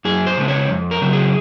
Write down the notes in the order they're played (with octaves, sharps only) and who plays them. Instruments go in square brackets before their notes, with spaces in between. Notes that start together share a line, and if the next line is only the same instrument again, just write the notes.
[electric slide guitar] F#2 G#4
C5
C#3 G#3 C4
C#5
F2
A#4
C#3 F#3 C4
G#4